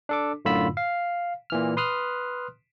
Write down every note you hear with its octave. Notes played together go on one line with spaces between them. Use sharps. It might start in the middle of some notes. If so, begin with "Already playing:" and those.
D4 A4 D6
F#2 A2 D3 F4 B5 E6
F5
A#2 E3 F6
B4 C6 D#6 F6 F#6